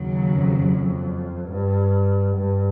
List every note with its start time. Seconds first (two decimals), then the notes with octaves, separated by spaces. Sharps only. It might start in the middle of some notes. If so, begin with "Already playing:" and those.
Already playing: D#2 C#3 F#3
0.33 F2
0.62 F2
1.48 G2
2.36 G2